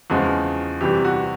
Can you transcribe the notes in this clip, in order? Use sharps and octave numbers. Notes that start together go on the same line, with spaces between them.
E2 C#3 F3 G#3 F#4
E2 C3 E3 G3 G4
F#4